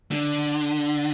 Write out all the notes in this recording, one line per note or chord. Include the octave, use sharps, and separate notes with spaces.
D3